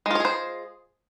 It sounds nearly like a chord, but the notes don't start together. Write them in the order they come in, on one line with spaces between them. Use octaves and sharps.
G#3 F4 C#5 G#4 C5